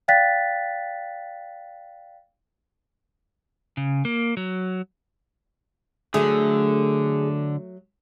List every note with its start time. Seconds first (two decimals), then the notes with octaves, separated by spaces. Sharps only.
0.08 D5 F5 G5 F#6 A6 B6
3.77 C#3
4.05 A#3
4.37 F#3
6.14 D3 F#3 A3 G#4